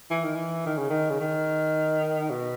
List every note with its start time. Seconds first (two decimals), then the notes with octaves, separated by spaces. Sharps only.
0.11 E3
0.24 D#3
0.36 E3
0.66 D#3
0.77 C#3
0.90 D#3
1.10 C#3
1.21 D#3
2.30 B2